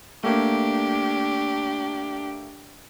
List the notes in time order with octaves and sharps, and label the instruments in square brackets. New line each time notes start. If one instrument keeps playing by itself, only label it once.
[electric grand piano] A3 A#3 [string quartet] D4 G4